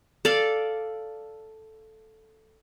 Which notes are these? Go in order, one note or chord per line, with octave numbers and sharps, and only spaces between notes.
A4 D5 F5